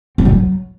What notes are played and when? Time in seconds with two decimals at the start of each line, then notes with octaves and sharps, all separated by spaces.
0.18 C4
0.25 B2
0.32 F#3